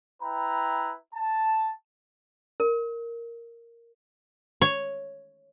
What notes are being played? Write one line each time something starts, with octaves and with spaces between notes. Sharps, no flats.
E4 B4 G5 A#5
A5
A#4
C#5